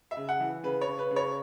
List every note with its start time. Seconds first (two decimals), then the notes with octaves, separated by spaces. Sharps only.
0.11 E5
0.17 C#3
0.29 F#5
0.40 E3
0.64 C#3 B4
0.81 C#5
0.87 C#3
0.99 B4
1.11 C#3
1.16 C#5